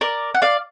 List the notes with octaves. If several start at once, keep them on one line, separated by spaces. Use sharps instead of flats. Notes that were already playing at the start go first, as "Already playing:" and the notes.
A#4 D5
F#5
D5 F5